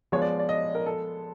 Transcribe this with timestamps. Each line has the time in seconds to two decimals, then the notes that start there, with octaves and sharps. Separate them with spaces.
0.12 F3 G#3 B3 C#5
0.22 D5
0.39 D5
0.49 D#5
0.75 A#4
0.86 A4